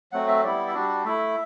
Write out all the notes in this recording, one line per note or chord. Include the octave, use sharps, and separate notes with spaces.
F#3 A3 C4 F#4 F#5
E5
G3 B3 E4 D5
E5
G3 D4 F#4 D5
A3 E4 E5